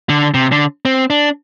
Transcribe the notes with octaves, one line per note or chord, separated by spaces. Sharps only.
D3
C3
D3
C4
D4